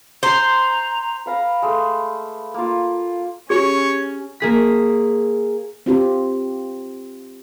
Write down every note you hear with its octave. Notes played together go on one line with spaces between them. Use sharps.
C5 A#5
B4 F5 A#5
G#3 A3
A#3 F4
C#4 G4 G#4 C#5
A#3 G#4 B6
C4 F4 G4